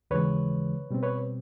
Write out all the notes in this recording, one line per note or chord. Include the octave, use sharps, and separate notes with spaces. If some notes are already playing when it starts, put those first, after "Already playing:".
D#2 C#3 E3 G#3 B4 C#5
B2 G3 C4
B4 C#5